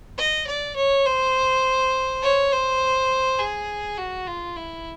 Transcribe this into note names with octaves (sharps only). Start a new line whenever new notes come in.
D#5
D5
C#5
C5
C#5
C5
G#4
F#4
F4
E4